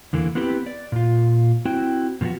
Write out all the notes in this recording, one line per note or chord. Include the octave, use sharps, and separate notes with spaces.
E2 D3 E3 A#3
B3 C4 E4 G4 B4
D5
A#2 F4
C4 E4 F#4 G5
B2 F3 G#3 B3 F#4